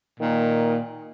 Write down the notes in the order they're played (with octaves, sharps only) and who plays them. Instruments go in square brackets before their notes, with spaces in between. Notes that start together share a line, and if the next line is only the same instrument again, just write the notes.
[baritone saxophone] A#2 [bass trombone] D#3